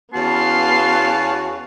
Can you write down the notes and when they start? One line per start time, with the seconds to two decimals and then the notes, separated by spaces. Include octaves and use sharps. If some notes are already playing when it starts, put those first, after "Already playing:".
0.14 E2 B3 C#4 F#4 F5 A5 C6